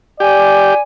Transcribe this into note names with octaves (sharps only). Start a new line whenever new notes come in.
G4 D5 G#5